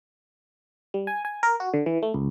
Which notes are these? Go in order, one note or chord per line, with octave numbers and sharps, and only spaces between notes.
G3
G#5
G#5
A#4
F#4
D3
E3
A3
C#2